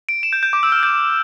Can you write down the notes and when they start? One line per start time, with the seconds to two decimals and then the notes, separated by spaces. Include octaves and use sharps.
0.09 D7
0.23 E7
0.33 G6
0.43 G6
0.53 D6
0.63 E6
0.72 F6
0.83 G6